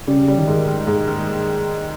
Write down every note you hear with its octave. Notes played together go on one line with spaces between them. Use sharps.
C#3 G3
G3
D#3
G#2
D#3
G#2
D#3